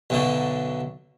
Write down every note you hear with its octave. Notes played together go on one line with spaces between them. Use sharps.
B1 F#2 D3